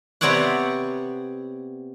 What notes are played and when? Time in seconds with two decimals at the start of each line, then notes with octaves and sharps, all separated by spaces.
0.21 C3 B3 C4 C#5 D5 F#5